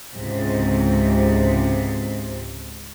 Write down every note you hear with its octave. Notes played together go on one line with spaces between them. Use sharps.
C#2 G#2 C3